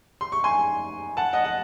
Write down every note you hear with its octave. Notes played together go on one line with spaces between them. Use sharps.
C6
C#6
G#5 C6
F#5 A5
D#5 F#5
F#5